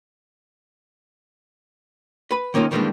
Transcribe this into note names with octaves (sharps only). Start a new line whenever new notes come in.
B4 B5
D#3 A#3 C#4 D#4 F4
D#3 E3 G3 G#3 A#3 D4